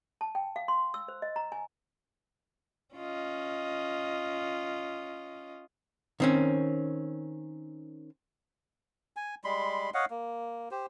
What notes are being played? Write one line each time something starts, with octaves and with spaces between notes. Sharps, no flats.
A5
G5
F5
C6
E6
C5
D#5
A#5
G#5
C#4 F4 D#5
D#3 C4 C#4
G#5
G3 G#3 B5 C6
C#5 D#5 F5 F#5
A#3
G4 C5